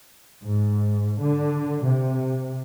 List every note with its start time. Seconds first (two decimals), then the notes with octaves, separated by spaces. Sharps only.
0.44 G#2
1.20 D3
1.86 C3